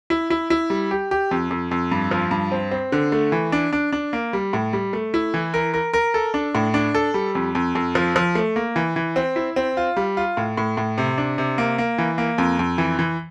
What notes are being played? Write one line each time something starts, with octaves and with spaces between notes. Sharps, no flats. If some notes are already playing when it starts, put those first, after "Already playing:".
E4
E4
E4
G3
G4
G4
F2
F2
F2
G2
F3
G2
C4
C4
D3
A3
E3
D4
D4
D4
A#3
G3
A2
G3
A3
E4
E3
A#4
A#4
A#4
A4
D4
A2
D4
A4
G3
F2
F2
F2
F3
F3
A3
A#3
E3
E3
C4
E4
C4
F4
G3
F4
A2
A2
A2
C3
D4
C3
A#3
A#3
E3
A#3
F2
F2
E3
E3